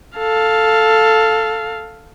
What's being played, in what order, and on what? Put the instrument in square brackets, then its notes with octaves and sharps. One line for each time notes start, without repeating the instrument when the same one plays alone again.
[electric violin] A4 F5